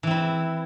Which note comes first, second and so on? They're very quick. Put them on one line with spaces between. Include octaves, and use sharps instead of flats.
E3 C4 E4